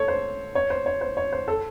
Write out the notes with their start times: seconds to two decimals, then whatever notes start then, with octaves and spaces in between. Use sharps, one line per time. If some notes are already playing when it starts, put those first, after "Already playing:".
Already playing: A4 C#5
0.08 C5
0.55 C#5
0.70 C5
0.86 C#5
1.01 C5
1.17 C#5
1.33 C5
1.48 A4